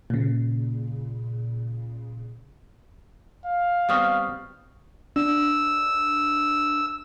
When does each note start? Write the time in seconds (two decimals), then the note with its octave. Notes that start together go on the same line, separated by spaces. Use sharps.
0.10 A#2 C#3
3.45 F5
3.89 G3 B3 C4 C#6 D#6 F6
5.16 D4 E6